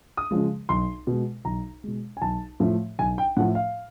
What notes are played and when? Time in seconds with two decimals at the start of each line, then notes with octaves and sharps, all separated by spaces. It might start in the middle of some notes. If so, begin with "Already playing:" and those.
0.17 D#6
0.31 C#3 F3 G#3
0.69 B1 C6
1.07 B2 G#3
1.45 B1 A#5
1.84 B2 G#3
2.17 G#5
2.22 B1 A5
2.60 A2 F3 A3
2.99 B1 G#5
3.18 G5
3.37 A2 F3 A3 F#5
3.55 F5